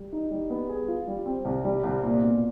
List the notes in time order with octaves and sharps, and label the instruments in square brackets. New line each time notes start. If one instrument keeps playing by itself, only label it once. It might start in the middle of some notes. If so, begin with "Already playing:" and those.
Already playing: [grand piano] G3
D#4
G3
B3
G#4
F4
G3
C4
C2
G3
C2
A#2
B2